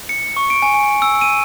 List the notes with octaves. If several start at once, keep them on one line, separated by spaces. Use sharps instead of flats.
C#7
C#6
D7
G#5
G#5
E6
D#7